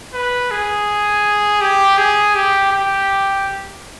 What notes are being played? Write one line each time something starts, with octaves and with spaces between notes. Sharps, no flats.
B4
G#4
G4
G#4
G4
G4